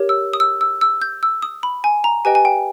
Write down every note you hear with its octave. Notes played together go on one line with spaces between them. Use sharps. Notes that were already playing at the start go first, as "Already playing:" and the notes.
Already playing: G4 A#4 C#5
E6
D#6
E6
E6
E6
G6
E6
D#6
B5
G#5
A#5
G4 B4 D#5 G5 G#5
G#5
G5